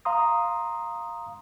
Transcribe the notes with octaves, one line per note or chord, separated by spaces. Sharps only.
F5 A#5 C6 D#6